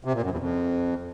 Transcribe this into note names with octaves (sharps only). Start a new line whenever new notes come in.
C3
A#2
F#2
E2
F2